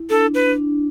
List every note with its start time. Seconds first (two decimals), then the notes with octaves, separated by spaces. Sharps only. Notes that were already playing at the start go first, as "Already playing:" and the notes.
Already playing: E4
0.10 D4 A4
0.34 B4
0.47 D4